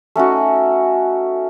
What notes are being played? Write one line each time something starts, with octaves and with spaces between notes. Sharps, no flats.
A3 C#4 D#4 F#4